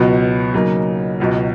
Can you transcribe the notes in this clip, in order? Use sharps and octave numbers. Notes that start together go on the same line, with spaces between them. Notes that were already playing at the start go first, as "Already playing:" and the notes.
Already playing: C#2 B2 F#3 B3
C#3 F#3 A#3 D#4
C#2 B2 F#3